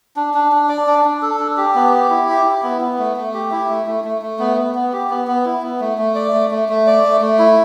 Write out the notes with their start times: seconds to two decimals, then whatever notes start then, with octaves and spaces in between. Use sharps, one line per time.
0.16 D4
0.34 D4
0.52 D4
0.69 D5
0.87 D4
1.05 D4
1.22 A4
1.39 D4
1.57 G4
1.75 B3
1.93 G4
2.10 E4
2.28 G4
2.45 E4
2.63 B3
2.81 B3
2.98 A3
3.16 A3
3.34 G4
3.51 E4
3.69 A3
3.87 A3
4.04 A3
4.22 A3
4.39 B3
4.57 B3
4.75 B3
4.92 G4
5.10 B3
5.27 B3
5.45 E4
5.63 B3
5.80 A3
5.98 A3
6.15 D5
6.33 A3
6.51 A3
6.69 A3
6.87 D5
7.04 A3
7.21 A3
7.39 E4